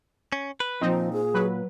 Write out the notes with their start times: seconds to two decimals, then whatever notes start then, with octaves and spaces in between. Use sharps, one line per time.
0.32 C#4
0.60 B4
0.81 A#2 F3 C4 D#4
1.13 G#4
1.34 F#3 B4